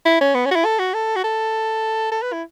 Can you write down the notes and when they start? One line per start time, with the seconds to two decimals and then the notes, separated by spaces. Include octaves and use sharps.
0.05 E4
0.21 C#4
0.35 B3
0.46 C#4
0.51 F#4
0.56 E4
0.65 A4
0.79 F#4
0.94 A4
1.16 F#4
1.24 A4
2.12 A4
2.22 B4
2.32 E4